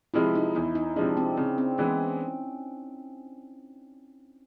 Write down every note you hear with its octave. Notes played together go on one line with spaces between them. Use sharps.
C3 F3 G#3 E4
D#4
E2 E4
D#4
C3 F3 G#3 D4
C4
C#3 C4
C4
E3 G#3 B3 C#4